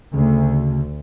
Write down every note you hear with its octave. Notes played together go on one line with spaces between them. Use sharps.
D2 C#3